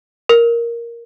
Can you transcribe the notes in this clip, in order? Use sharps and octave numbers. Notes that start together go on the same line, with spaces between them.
A#4